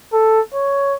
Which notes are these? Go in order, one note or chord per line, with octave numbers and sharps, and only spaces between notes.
A4
C#5